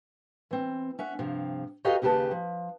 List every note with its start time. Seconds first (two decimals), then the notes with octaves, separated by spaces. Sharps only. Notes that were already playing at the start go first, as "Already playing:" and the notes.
0.51 E3 C4
0.99 C#4 E5 F#5
1.19 G2 C3 F3
1.85 F#4 G4 A4 B4 D#5 F5
2.02 D#2 C#3 G4 A4 B4 A5
2.31 F3